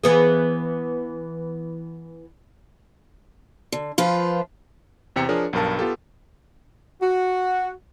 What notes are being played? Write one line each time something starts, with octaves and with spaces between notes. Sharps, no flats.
E3 B3 G#4
D3
F3 F4 B4 C5
E2 C3 G5 C#7
F3 D4 G#4 A#4 C#5
B1 G2 A#4 A5
B3 F4 G4 A4
F#4